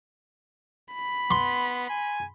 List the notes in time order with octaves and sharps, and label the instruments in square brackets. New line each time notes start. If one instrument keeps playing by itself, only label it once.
[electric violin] B5
[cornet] B3 [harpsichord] C6
[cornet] G#5